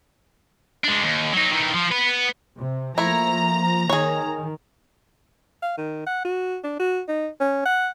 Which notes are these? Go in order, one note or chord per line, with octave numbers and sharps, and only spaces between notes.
G#3 D4
D#2
F#3 D#4
D#3 E3
F3
B3 B4
C3
F3 A3 A#3 E4 A#5
D#3 G#4 C#5
F5
D#3
F#5
F#4
D4
F#4
D#4
C#4
F#5